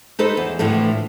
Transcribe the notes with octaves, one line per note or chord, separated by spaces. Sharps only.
D#4 A4 B4 C5
E2
A2 D3 E3 F3 A3